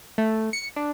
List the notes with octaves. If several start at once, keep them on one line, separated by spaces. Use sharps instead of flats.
A3
C#7
D4